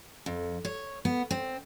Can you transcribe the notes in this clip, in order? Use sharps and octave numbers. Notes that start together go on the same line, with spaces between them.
F2
C#5
B3
C4